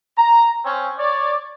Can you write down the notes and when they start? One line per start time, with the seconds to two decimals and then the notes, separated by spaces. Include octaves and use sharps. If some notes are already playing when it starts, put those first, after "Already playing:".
0.17 A#5
0.65 C4 C#4
0.98 C#5 D5